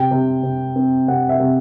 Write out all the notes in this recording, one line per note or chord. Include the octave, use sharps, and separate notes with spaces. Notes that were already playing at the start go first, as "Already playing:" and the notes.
Already playing: C3 G5
C3
C3
C4
C3 F#5
E5
C3